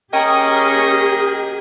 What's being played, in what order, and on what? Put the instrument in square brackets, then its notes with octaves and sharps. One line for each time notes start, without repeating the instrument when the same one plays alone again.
[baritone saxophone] C#4 [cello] G4 G#4 [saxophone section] A#4 D#5 [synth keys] G5 A#5 D#6